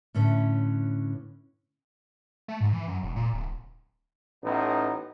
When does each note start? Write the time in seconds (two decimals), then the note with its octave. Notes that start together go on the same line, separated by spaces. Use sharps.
0.14 A2 D3 C#4 B4
2.48 A3
2.61 G#2
2.73 E3
2.88 F#2
3.03 E1
3.16 A#2
3.34 D1
4.43 A1 B3 D#4